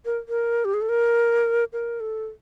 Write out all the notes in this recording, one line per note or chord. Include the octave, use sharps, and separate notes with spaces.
A#4
A#4
G4
G#4
A4
A#4
A#4
A4